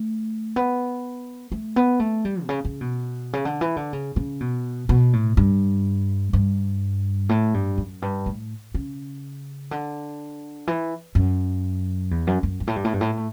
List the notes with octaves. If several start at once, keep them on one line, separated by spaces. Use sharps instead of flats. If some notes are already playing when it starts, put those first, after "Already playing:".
Already playing: A3
B3
A3
B3
A3
G3
B2
C#3
C#3
B2
C#3
D3
E3
D3
C#3
C#3
B2
B2
A2
G2
G2
A2
G2
F#2
G2
A2
C#3
D3
E3
F#2
E2
F#2
F#2
G2
A2
G2
A2
G2
A2
A2